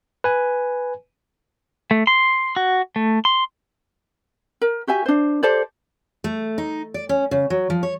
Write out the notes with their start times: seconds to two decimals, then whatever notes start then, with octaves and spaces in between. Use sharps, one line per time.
0.24 B4 G#5
1.91 A3
2.07 C6
2.56 F#4
2.96 A3
3.25 C6
4.61 A#4
4.87 F#4 G4 E5 G#5
5.06 D4 C5
5.43 G4 A4 C5 D5
6.24 A3
6.58 D#4
6.94 D5
7.09 C#4
7.31 C#3
7.50 F#3
7.70 F3
7.83 C#5